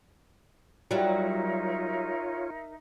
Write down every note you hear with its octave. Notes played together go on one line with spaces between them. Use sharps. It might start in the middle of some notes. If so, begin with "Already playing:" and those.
F#3 G3 D#4 F4 A#4 C#5 E5